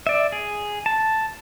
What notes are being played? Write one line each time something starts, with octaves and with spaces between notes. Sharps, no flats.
D5 E5
G#4
A5